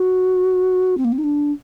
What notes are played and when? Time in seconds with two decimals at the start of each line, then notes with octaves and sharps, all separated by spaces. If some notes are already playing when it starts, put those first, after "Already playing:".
Already playing: F#4
0.98 C4
1.05 A#3
1.12 C4
1.18 D#4
1.24 D4